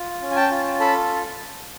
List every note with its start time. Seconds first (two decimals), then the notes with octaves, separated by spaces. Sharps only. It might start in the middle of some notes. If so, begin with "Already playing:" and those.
Already playing: F4
0.22 C#4
0.31 G#5
0.36 G5 A5
0.51 F4
0.80 A4 A5 B5